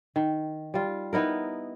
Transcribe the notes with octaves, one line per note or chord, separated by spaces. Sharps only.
D#3
G3 F4
B3 D#4 E4 A#4